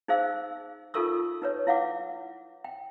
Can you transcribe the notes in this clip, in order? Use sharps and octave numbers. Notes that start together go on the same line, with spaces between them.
D#4 G#4 C5 F5 E6
D#4 F4 A4 A#4 C#6 E6
D#4 B4 C#5
E4 F5 F#5 D6
G5